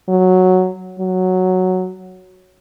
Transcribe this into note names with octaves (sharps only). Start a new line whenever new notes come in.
F#3
F#3